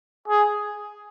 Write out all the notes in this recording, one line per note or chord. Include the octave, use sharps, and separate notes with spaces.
G#4